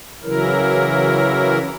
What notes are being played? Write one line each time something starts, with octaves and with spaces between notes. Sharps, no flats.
C#3 E3 F#3 E4 A#4